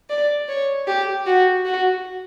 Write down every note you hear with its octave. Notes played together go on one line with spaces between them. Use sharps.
D5
C#5
G4
F#4
F#4